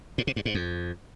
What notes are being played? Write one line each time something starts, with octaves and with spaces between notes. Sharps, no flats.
A2
C3
G2
G#2
F2